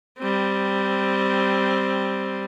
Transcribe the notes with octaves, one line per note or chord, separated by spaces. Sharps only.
G3 C4